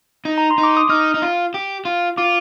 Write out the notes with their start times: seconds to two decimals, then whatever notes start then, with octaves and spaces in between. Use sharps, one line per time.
0.25 D#4
0.38 A#5
0.51 C6
0.58 D#4
0.63 D6
0.77 D#6
0.89 D#4 F6
1.14 D#4
1.22 F4
1.54 G4
1.85 F4
2.17 F4 D6